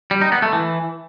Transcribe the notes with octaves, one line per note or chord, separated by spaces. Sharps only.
G3
D#4
B3
A3
E3